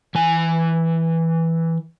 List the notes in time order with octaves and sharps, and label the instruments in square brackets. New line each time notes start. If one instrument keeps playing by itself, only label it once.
[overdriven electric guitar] E3 G#5